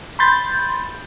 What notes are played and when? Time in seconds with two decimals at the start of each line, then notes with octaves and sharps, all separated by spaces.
0.19 B5 C6 G6 A6